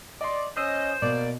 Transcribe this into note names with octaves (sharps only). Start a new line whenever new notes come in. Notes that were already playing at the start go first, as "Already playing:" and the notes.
D5 D#5 C6
C#4 C5 D#5 E6 D#7
B2 A#3 D5